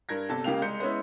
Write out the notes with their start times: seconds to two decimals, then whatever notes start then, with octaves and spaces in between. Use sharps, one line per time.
0.09 G2 A#4 G#6 A#6
0.29 G1 C3 A4 A5
0.44 C#2 C#3 A#3 G4 F5 F7
0.62 C2 G#3 G6 C#7
0.80 G#3 B3 C#4 E4